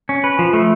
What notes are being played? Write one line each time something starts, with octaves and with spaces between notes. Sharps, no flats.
C#4
B4
F3
A3